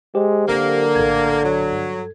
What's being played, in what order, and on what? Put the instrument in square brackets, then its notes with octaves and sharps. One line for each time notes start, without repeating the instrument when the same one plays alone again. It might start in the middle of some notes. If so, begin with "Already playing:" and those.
[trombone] G#3 [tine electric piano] G4 C5
[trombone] D3 [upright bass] F#3 C4 [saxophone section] A#3
[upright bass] A#1 A2 [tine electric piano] A4 G#6
[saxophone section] F#3
[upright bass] G2